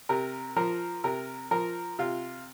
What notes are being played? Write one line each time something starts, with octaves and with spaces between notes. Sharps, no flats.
C3 A#4
F3 A#4
C3 A#4
F3 A#4
C3 F4